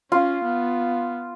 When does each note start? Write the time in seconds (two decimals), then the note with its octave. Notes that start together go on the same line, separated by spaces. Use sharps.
0.12 C#4 F4
0.45 B3